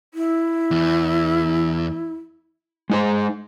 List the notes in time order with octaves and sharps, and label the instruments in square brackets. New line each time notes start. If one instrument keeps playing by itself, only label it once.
[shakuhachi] E4
[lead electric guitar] E2
[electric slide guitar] G#3 D#4 C5